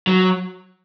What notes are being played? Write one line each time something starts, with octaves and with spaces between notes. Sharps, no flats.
F#3